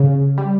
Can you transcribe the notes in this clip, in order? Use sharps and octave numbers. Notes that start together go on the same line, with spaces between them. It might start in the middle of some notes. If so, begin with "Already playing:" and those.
Already playing: C#3
G3